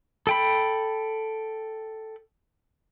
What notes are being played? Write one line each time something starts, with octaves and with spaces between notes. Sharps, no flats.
A4 G5 B5